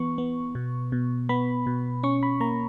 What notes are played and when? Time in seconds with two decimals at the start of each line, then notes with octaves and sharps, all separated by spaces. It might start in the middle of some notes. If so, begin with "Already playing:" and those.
Already playing: E3 B3 C#6
0.18 B3
0.55 B2
0.92 B2
1.29 B3 B5
1.67 B2
2.03 C#4 C#6
2.23 B5
2.40 A#3 A#5